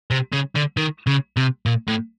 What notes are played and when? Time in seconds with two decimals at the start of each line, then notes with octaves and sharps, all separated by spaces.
0.11 C3
0.32 C#3
0.55 D3
0.77 D#3
1.07 C#3
1.37 C3
1.66 A#2
1.88 A2